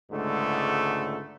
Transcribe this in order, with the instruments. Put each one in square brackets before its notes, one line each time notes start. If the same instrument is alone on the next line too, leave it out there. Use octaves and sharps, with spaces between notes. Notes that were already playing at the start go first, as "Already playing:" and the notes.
[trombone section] C#2 G#2 D3 A3